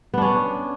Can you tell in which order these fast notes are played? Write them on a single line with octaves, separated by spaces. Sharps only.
B3 D4 C#4